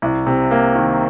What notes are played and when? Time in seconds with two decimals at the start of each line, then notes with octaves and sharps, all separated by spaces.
0.02 C2
0.27 C3
0.51 A#3
0.76 D#3